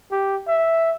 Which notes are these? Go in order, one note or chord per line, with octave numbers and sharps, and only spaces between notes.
G4
E5